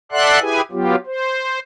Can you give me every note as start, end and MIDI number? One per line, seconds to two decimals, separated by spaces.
0.12 0.39 69
0.12 0.39 74
0.12 0.39 76
0.12 0.39 78
0.12 0.39 84
0.12 0.39 90
0.40 0.61 64
0.40 0.61 67
0.40 0.61 68
0.40 0.61 71
0.40 0.61 80
0.72 0.95 54
0.72 0.95 59
0.72 0.95 65
0.72 0.95 67
1.06 1.59 72